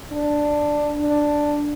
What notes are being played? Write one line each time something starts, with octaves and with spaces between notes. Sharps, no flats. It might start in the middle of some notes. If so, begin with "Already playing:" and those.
D4
D4